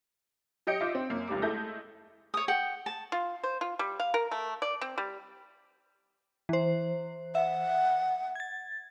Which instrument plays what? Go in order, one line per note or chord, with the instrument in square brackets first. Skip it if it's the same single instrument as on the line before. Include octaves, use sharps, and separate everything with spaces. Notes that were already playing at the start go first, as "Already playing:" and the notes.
[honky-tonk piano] F#3 G4 D#5 G6 C#7 D7
F4 D#5 E5 D6
C4
F#2 A#3
F1 C#2 G3 D6
G#3 A3 E4 A4 G6 A#6
[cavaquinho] C#5 D#6
F#5 G5
A5
[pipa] F4
C5
F4
G3
F5
A#4
A3
D5
C4
G3
[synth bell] E3 C5
[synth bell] E5 [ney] F#5
[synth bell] G#6 A6